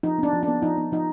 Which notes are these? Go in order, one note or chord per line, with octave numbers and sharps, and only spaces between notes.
F3 D#4
B3 D4
F3
D4
B3
F3 D#4
B3
F3 D#4